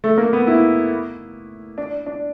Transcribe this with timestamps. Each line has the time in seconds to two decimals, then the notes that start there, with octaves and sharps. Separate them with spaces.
0.04 A3
0.18 A#3
0.33 B3
0.47 E4
1.78 D4
2.06 D4